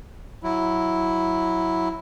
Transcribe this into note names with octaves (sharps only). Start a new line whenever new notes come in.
F#3 E4